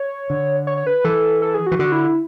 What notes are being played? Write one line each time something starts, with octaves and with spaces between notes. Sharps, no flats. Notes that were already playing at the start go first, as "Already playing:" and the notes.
Already playing: C#5
D3
C#5
C#5
B4
E3 A4
A4
G#4
F#4
E3
D3 F#4
E4
E4